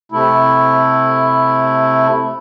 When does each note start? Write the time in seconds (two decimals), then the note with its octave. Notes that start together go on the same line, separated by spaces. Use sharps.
0.12 C3 A3 E4